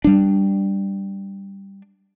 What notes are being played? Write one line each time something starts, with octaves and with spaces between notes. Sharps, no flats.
G3 D4